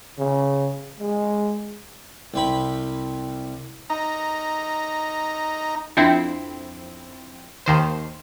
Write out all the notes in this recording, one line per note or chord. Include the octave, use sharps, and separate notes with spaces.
C#3
G#3
C2 C4 B5
D#4 A#5
F2 C4 D4 E4
D#2 D#3 C5